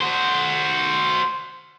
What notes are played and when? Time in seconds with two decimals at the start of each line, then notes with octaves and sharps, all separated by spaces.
0.01 F#4 C5